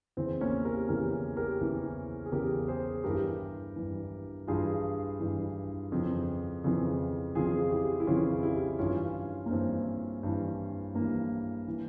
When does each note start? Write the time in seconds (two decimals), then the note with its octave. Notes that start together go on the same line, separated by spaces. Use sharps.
0.17 E2 C#3 E3 C4
0.41 A#3 C#4
0.65 G4 A#4
0.89 E2 C#3 E3 G4 A#4
1.37 G4 A#4
1.61 E2 C#3 E3
2.26 G#4
2.32 E2 C#3 E3 G4 A#4
2.68 G#4 C5
3.04 G2 E3 G4 A#4
3.76 G2 E3
4.47 G2 E3 F4 G#4
5.20 G2 E3
5.92 F2 C#3 E3
6.64 F2 C#3 E3
7.35 F2 C#3 E3 F4 G#4
7.71 E4 G4
8.00 E4
8.07 F2 C#3 E3 C#4 F4
8.43 E4 G4
8.79 G2 E3 C#4 F4
9.46 A#3
9.50 G2 E3 C4
10.23 G2 E3
10.95 G2 E3 A#3
11.68 E3